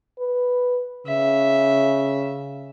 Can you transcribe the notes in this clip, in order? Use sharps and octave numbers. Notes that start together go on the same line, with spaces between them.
B4
C#3 E5